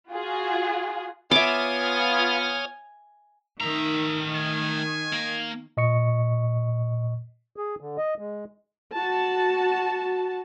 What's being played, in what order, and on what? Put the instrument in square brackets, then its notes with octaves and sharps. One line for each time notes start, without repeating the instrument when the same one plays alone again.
[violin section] F4 F#4 G#4
[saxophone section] B3 F4 [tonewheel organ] C#5 D#6 F6 [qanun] E5 D6 [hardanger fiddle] G#5
[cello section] D#3 [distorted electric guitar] A3 A#5 [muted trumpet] E5
[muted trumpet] G#5
[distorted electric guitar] A#3
[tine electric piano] A#2 D#5 C#6 C#7
[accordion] G#4
D3
D#5
G#3
[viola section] F#4 A5